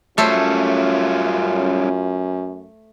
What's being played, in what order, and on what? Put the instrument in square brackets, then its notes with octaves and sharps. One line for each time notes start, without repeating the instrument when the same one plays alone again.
[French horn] F#2 [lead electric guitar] G3 C#4 [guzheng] A3 A4 C5 [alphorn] F4